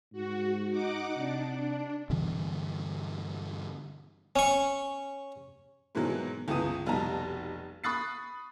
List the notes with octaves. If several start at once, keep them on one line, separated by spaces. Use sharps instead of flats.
G#2 F#4
D#4 F#5 D6
C3 D4
G2 B2 D3 E3
C#4 C#6
G#2 B2 D#3 E3 F#3
G1 C#2 E3 B3 D#6 D#7
F1 B1 G3 D#4 A5 A#5
B5 C#6 D#6 F#6 A6 C7